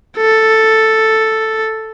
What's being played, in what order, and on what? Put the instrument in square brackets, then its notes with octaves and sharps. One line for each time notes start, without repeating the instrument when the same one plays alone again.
[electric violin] A4